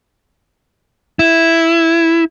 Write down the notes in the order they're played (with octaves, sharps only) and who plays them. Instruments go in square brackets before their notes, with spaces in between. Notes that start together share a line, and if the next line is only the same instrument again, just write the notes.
[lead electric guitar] E4